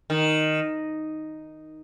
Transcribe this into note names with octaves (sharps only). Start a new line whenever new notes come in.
D#3